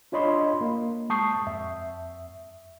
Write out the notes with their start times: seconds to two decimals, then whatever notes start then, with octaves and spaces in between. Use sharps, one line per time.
0.12 D4 F4 C#5 D#5 B5 C6
0.61 A#3
1.10 G#3 A5 C#6 D#6 G6 C7
1.47 F2 E5